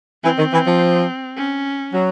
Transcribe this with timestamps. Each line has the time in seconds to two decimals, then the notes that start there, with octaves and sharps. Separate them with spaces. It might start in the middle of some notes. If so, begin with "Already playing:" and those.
0.23 E3 C4
0.38 D#3
0.53 E3
0.66 F3
1.37 C#4
1.93 F#3